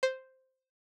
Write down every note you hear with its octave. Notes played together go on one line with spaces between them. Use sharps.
C5